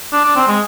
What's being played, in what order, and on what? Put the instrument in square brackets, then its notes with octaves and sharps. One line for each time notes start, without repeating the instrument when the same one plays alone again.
[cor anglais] D4
D4
C4
G#3